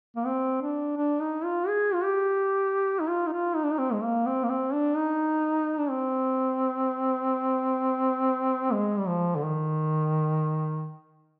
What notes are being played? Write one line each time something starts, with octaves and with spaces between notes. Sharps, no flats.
A#3
C4
D4
D4
D#4
F4
G#4
F4
G4
D#4
F4
D#4
F4
D#4
D4
D#4
C4
G#3
A#3
C4
A#3
C4
D4
D#4
D4
C4
G#3
G3
F3
D3
D#3